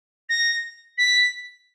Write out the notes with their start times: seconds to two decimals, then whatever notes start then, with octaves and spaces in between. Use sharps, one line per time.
0.29 A#6
0.97 B6